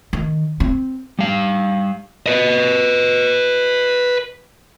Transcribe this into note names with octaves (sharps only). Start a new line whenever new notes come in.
D#3
C4
G3 F5
B4 D#5